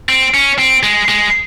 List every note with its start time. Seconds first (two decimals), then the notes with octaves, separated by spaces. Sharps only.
0.09 C4
0.34 C#4
0.58 C4
0.83 G#3
1.08 G#3